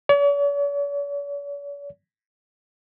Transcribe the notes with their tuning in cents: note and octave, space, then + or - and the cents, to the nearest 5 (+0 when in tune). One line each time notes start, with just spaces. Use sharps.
C#5 +45